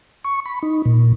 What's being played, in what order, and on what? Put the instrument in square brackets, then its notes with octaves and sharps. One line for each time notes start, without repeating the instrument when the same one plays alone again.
[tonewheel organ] C#6
B5
D#4
A#2